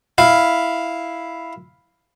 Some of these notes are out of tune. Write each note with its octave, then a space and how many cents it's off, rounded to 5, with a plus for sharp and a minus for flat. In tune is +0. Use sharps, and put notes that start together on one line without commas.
E4 +0 F5 +0